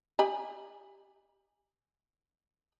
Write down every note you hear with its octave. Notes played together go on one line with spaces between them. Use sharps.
G4 G#5 B5